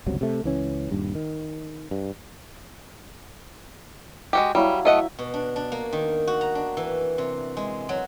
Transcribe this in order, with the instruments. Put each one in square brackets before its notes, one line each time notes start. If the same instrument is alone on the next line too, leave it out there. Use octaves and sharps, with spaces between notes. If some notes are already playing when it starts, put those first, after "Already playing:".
[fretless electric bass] G1 C#2 C3 F#3
C3 A3
C#2 E3 C#4
D#1 G2
D#3
G2
[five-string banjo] G#3 F#4 G4
[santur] F#3 E4 F5 [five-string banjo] G3
[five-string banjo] A3 D#5 F#5 [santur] E5
[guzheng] B2
D4
D4
A#3
D#3
F#4
A#5
D4
E3
C3
G#3
F#3